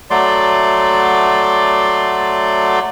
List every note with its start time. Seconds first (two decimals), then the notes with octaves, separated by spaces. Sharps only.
0.10 F#3 A3 D5 C6